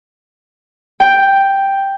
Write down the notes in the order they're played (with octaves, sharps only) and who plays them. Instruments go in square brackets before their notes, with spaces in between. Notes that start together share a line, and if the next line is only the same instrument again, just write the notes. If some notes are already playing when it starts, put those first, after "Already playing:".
[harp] G5